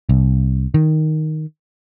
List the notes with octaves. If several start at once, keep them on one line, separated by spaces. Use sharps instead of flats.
C2
D#3